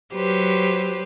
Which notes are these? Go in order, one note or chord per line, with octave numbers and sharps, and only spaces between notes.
F#3 G4 B4 C5